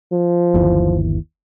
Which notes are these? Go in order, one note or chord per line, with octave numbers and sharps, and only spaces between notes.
F3
G1 D#2 E3